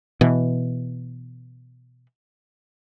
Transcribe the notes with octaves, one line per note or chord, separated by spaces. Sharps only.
B2 E3